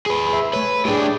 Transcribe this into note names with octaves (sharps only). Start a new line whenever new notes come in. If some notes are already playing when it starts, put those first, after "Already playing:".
G#4 B4
E5
A3 B4 C#5
A2 D4 G4 G#4